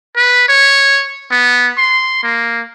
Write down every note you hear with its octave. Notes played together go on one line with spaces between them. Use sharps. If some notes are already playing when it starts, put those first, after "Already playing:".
B4
C#5
B3
C6
A#3